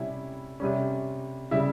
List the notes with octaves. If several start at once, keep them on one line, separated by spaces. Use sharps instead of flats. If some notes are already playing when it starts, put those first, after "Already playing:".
Already playing: C3 G3 C#4 E4
C3 G3 C#4
C#3 G3 E4 E5